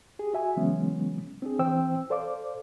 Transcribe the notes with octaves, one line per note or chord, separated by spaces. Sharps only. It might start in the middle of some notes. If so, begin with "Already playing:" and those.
G4 G#4
F#4 E5 G#5
C#3 E3 F#3 G#3 B3 C#4
C4 D4 G#4
E3 C4 C5 G5 E6
A4 C5 D5 F5 D6